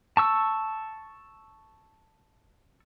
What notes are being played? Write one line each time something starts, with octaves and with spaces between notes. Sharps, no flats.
A5 C#6 E6